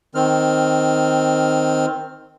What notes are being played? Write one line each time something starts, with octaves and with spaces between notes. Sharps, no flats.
D#3 C4 F6